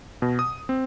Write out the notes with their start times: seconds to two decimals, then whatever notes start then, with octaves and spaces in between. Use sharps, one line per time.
0.22 B2
0.39 D#6
0.69 C4